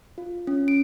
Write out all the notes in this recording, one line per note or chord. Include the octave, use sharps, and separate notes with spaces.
F4
C#4
D7